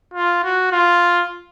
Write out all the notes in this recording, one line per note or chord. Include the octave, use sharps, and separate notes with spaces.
F4
F#4
F4